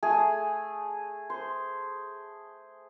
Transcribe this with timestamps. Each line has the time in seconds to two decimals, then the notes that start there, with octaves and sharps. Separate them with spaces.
0.03 A3 G#4
1.30 C5